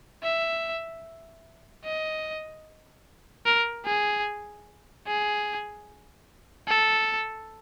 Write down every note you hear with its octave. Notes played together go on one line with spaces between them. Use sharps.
E5
D#5
A#4
G#4
G#4
A4